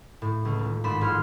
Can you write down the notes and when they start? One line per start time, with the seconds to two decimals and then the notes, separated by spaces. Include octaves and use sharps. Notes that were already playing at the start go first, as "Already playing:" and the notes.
0.22 A2
0.45 C#2
0.59 D#1
0.84 G#1 D4 B5 C6 E7
1.01 D#1 A1 G#4 C6 F6